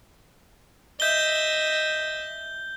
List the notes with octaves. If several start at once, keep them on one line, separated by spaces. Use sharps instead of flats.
D#5 E5 G6 G7